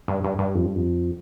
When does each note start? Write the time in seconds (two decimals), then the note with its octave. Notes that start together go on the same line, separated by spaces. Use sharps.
0.08 G2
0.24 G2
0.39 G2
0.54 F2
0.65 G2
0.75 F2